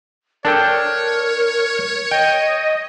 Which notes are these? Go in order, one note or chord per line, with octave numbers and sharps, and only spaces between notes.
D4 A4 A#4 C#5 G5
D#5 G5